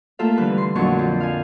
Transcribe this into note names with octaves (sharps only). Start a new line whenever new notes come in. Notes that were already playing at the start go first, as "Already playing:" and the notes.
A3 A#3 F4 A4 E5 F5
D3 E3 G3 B4
C6
F2 A#2 D3 F#3 C#6
F3
F5 G#5